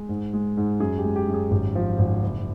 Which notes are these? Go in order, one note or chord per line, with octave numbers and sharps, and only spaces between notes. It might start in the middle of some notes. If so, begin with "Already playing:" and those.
Already playing: G#3
G#2
G#3
G#2
F#2 G#4
G4
G#3
G4
F#2
G#4
G#1 G4
F3
G#1
F#1